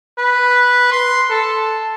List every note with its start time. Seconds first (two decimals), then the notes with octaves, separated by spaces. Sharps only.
0.18 B4
0.91 C6
1.30 A4